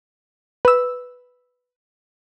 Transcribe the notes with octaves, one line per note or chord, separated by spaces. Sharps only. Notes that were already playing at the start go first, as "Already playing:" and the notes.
B4 E6